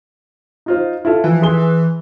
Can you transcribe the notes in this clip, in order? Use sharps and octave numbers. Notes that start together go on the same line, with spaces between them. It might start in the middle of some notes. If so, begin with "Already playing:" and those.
D#4 F4 C5
E4 F4 A4
E3 F3
G#4 C6 G7